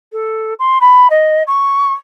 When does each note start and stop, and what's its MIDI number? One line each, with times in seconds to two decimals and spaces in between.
0.12 0.54 69
0.59 0.79 84
0.81 1.08 83
1.10 1.43 75
1.47 1.94 85